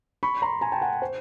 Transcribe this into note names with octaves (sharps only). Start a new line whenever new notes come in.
B5 C#6
A#5 C6
G#5 A#5
G5 A5
F#5 G#5
C5